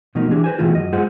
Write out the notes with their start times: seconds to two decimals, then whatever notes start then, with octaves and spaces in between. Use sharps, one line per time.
0.15 B2 F3 A3 A#3 D#4
0.31 E3 D4 G4 G#4
0.44 B4 C5 G#5
0.58 B2 D#3 E3 A3 F4 G#4
0.75 F#2 D#5
0.92 G#3 F4 G#4 C5 F#5